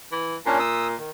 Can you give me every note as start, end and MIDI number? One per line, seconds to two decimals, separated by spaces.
0.12 0.36 52
0.46 0.95 46
0.46 0.59 61
0.46 0.59 62
0.59 0.88 87
0.59 0.88 88
0.97 1.11 51